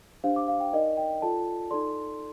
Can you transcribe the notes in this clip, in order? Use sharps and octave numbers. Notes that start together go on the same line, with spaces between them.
D4 G4 C5 F5
D6
F5
G5
D#4 A#4 D5 D#5
G5
F4 A4 D5 A5
D#4 A4 D5 C6